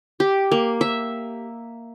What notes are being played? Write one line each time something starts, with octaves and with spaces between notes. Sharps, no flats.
G4
A#3
E5